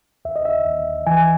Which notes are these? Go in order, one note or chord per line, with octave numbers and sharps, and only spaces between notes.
D#2 E5
D#5
E5
D#2
E3 G#5